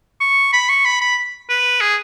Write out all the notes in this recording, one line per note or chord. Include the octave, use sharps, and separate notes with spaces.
C#6
B5
C#6
B5
B5
B4
G#4